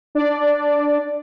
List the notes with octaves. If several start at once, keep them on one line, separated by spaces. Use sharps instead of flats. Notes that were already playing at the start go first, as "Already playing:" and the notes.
D4 D5